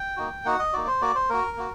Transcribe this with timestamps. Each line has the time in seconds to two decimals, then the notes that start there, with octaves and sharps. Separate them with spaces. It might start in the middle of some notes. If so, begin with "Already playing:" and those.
Already playing: G5
0.17 A#3 D#4 F#4
0.45 A#3 D#4 F#4 F#5
0.59 D#5
0.73 A#3 D#4 F#4 D5
0.87 C5
1.02 A#3 F#4 D5
1.15 C5
1.30 A#3 F#4 A#4
1.57 A#3 F#4